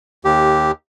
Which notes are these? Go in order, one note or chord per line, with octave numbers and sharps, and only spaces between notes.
D#2 G4